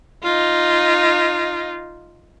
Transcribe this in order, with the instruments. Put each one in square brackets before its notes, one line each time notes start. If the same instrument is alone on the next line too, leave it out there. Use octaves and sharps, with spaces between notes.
[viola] D#4 F4